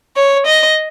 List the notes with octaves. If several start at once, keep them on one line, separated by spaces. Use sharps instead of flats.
C#5
D#5